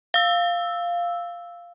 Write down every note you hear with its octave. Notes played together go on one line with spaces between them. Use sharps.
F5 E6